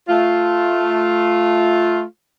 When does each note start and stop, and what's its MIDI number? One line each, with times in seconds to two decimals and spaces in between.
0.09 2.03 57
0.09 2.03 65